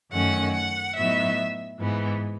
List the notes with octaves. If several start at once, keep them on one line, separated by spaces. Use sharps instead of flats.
F#2 D#3 A3 C#4 F#5
F#5
A2 F#3 B3 D#4 E5
G#2 E3 B3